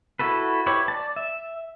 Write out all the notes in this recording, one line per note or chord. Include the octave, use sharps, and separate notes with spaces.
E4 F#4 A4 B4
E4 G4 B4 C#5
D5 A5
E5